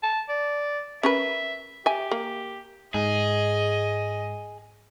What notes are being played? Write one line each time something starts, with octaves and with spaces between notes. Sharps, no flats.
A5
D5
C#4 A#4 B4 E5
G4 E5 G#5
A#3
G#2 G#4 D#5